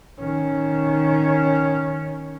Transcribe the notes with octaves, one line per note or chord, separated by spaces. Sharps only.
D#3 C#4